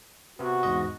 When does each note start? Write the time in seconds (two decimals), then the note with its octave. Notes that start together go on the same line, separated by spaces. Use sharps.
0.39 C3 B3 F#4
0.63 E2 G#2 D#5